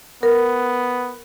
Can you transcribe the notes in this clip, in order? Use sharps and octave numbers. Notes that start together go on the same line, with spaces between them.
B3 A#4